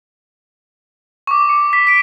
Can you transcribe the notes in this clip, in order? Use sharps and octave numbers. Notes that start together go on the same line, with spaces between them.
C#6 D6
C#7
B6
B6 D7